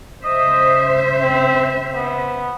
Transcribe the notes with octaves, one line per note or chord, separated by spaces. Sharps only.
C#3 C5 D#5 E5
C4
B3